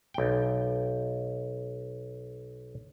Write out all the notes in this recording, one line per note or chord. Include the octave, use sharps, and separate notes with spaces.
B1 G5